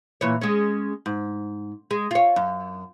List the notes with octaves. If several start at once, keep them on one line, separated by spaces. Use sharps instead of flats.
A#2 E3 C#5
G#3 C#4
G#2
G#3
F4 C#5
F#2